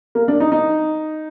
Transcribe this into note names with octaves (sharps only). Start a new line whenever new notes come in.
A#3
D4
D#4
D#4